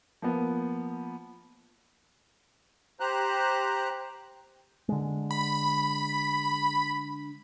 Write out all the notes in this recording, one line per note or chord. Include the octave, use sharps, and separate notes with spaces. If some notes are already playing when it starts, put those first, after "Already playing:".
F3 A#3 B3
G4 C5 A#5 F#6
D3 G#3
B5